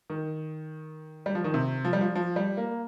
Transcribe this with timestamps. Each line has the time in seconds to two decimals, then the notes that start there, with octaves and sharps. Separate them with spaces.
0.10 D#3
1.26 G3
1.35 F3
1.44 D#3
1.54 C3
1.85 F3
1.93 G3
2.01 F3
2.15 F3
2.36 G3
2.57 A#3